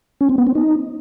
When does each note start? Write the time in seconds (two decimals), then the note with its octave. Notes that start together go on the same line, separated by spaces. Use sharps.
0.21 C#4
0.29 C4
0.38 B3
0.47 C4
0.55 D#4